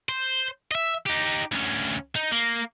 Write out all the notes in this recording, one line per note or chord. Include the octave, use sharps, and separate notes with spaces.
C5
D#5 E5
D#4 G4
D2 C#4
D#4
A#3